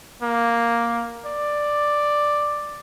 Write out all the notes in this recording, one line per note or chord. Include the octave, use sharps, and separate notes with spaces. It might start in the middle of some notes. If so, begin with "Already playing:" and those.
A#3
D5